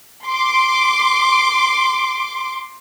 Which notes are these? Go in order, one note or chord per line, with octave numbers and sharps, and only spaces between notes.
C6 D6